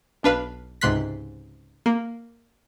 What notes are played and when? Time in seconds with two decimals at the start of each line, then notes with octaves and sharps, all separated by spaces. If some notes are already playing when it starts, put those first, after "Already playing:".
0.23 B1 D4 B4 F5
0.81 C#2 G#2 C3 C6 F#6 B6
1.86 A#3